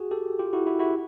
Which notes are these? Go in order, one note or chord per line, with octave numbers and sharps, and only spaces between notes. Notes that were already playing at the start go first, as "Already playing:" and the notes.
Already playing: F#4 G#4
G4 A4
F4 G4
E4 F#4
E4 F#4
E4 F#4